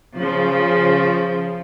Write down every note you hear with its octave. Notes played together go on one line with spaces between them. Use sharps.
C#3 F3